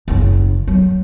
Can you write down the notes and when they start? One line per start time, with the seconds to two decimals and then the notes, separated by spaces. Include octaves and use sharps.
0.08 F#1 C#3
0.67 F#3